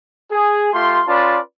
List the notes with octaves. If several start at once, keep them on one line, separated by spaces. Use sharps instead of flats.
G#4
A3 F4 G4 C6
C#4 F4 B4 D5 A5 C6